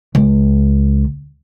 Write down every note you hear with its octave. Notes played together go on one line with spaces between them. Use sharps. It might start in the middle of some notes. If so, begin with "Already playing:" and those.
C#2